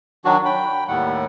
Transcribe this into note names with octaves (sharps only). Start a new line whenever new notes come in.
D#3 F#3 D4 F#4
G5 B5
D#2 A2 D#3 G3 F#5